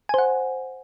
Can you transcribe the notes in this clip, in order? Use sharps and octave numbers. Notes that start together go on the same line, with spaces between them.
C5 F#5 G#5